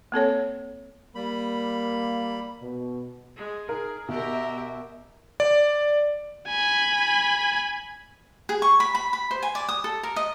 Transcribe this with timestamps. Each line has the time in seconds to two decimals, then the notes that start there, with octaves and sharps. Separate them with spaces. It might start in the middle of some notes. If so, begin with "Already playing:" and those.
0.12 A#3 C4 A4 C#5
1.15 G3 A#3 B5
2.61 B2
3.36 G#3
3.69 G#4 A#4
4.08 B2 G4 A#4 E5
5.40 D5
6.48 G#5 B5
8.49 G#4
8.62 C#6
8.80 B5
8.95 B5
9.13 B5
9.31 C5
9.42 G#5
9.55 D5
9.69 D#6
9.84 A4
10.03 A#4
10.16 D#5